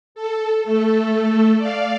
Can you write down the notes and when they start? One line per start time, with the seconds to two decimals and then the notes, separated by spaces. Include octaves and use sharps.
0.15 A4
0.64 A3 A4
1.58 D5 F5